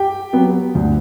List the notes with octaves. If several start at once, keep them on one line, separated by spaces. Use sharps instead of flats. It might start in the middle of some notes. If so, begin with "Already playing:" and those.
Already playing: G4 G5
F#3 B3
D2